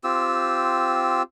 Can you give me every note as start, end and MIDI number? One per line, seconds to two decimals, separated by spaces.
0.04 1.23 60
0.04 1.23 65
0.04 1.23 67
0.04 1.23 88